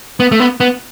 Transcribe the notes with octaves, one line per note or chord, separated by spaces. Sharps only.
B3
A3
B3
B3